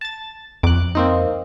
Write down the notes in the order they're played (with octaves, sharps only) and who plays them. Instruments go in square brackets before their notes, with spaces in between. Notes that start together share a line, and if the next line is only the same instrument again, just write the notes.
[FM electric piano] A5 A6
[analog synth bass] F2 [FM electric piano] D6 F#6
[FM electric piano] A#3 C4 D#4